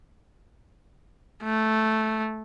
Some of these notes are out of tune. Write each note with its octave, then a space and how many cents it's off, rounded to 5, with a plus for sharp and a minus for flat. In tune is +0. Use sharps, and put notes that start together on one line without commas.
A3 -5